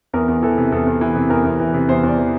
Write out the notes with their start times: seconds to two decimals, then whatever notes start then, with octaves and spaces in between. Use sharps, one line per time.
0.13 E2 A#4
0.28 E2
0.43 E3 A4
0.58 C3
0.72 E2 A4
0.87 E2
1.01 E3
1.15 C3
1.30 E2 A#4
1.45 E2
1.60 E3
1.74 C3
1.89 E2 C5
2.03 E2 D5
2.18 E3